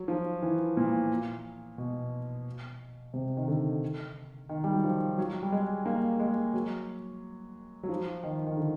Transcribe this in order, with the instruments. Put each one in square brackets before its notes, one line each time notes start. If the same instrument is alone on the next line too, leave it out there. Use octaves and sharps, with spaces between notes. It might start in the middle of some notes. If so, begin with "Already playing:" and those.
Already playing: [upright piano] F#3
F3
E3
A#2
B2
C3
D#3
D3
D#3
G3
F#3
F3
F#3
G3
G#3
A#3
G#3
F#3
F#3
F3
D#3
D#3
D3